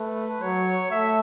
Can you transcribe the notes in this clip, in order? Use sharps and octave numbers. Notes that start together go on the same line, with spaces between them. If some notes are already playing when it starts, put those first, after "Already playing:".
Already playing: A3 B4
F#3 C#5
A3 E5